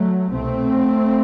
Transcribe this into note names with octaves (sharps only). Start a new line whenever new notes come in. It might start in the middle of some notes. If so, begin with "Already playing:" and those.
Already playing: F#3 A3
C2 B2 A3 C4